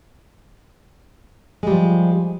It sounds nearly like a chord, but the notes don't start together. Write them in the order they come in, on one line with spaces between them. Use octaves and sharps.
G#3 G3 F3